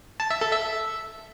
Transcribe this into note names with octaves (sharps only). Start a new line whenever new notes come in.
A5
E5
A4
E5